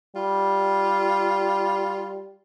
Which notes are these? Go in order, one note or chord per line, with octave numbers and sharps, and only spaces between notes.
G3 F4